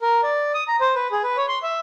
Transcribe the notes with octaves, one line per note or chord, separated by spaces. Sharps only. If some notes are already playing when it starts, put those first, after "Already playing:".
A#4
D5
D#6
A#5
C5
B4
G#4
B4
C#5
C6
E5